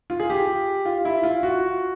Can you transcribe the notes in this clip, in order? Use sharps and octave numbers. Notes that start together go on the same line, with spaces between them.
F4
G#4
G4
F4
E4
F4
F#4